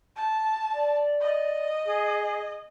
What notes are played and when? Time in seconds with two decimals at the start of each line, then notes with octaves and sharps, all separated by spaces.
0.16 A5
0.73 D5
1.21 D#5
1.86 G#4